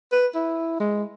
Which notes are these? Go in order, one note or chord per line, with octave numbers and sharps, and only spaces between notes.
B4
E4
G#3